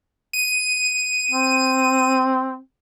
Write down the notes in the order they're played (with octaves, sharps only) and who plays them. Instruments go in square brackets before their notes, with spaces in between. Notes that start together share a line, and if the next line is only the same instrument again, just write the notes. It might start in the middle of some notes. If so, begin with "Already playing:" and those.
[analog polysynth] D#7
[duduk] C4